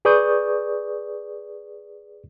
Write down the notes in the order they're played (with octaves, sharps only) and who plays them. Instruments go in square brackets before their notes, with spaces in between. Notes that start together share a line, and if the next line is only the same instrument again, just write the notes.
[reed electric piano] G#4 B4 D5 C#6 D#6 G6